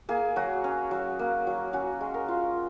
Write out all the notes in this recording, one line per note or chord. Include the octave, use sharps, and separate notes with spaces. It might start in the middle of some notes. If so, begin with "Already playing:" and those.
A#3 G#4
F#3 F#4
C#4
F#3
A#3
F#3
C#4 F#4
G#3
A#4
F4